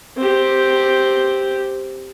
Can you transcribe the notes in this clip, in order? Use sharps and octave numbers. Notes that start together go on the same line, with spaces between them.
C4 G4